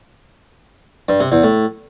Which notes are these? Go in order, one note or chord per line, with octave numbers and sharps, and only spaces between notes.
G2
C3
E2
A2